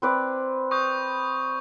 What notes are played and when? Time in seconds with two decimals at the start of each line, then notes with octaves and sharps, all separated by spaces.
0.02 C4 B4 D5
0.71 C#6 D#6 G6